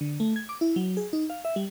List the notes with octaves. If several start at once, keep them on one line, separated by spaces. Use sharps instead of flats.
D3
A3
G#6
D6
E4
F#3
G#4
D#4
F5
E5
G3